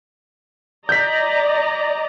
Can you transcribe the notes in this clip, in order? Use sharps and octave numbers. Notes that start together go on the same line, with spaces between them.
D5 D#5 A#5 G6 B6